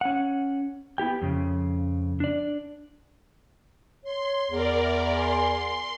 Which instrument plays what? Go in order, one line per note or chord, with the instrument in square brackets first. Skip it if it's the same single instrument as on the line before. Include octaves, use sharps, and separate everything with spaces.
[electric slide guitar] C#4 F#5
B3 E4 G4 G5
F2 C#3
D4 D5
[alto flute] C#5 [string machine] C6
[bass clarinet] E2 [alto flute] G#4 [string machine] A#4 D5
[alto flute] E5
[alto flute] G#5 [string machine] C6